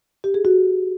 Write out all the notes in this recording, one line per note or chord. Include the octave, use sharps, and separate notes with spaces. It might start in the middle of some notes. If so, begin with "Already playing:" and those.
G4
G#4
F#4